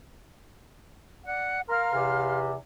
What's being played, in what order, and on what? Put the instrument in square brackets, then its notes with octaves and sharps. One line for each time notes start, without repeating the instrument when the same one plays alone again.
[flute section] D5 F#5
[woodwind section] A#4 [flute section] F5 C6 F6
[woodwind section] E2 C3